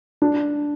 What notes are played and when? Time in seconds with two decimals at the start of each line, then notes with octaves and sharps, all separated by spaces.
0.22 D4